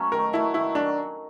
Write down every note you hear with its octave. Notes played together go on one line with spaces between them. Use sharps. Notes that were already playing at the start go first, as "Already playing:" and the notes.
Already playing: F#3 A3 C#4
D#3 A#4
F#3 A3 E4
D#3 E4
F#3 D4